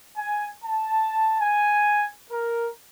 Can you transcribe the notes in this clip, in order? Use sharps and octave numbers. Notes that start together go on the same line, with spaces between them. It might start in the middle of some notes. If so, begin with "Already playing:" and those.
G#5
A5
G#5
A#4